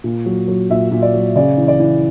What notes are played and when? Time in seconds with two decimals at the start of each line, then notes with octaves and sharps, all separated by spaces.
0.04 A#2
0.26 F#3
0.48 F#3
0.70 A#2 E5
0.91 A#2
1.02 D5
1.14 F#3
1.36 C#3 D5
1.58 E3
1.68 D5
1.80 E3